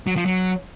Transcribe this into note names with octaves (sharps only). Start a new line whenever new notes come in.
F#3
F3
F#3